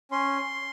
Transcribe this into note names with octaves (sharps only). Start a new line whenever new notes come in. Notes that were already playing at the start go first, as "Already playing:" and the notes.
C#4 C6